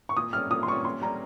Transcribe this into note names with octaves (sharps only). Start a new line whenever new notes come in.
C#6
A#2 D#6
G3 C#4 F6
A#2 D#6
C6
G3 C#4 C#6
A#2 C6
G3 C#4 A#5